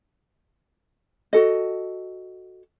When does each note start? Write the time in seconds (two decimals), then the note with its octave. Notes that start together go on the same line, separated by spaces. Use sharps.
1.33 F#4 A4 D#5